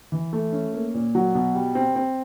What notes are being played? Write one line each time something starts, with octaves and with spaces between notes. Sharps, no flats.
E3
A3
C#4
A#3
A#2
F#3
B2
G3
C4
C4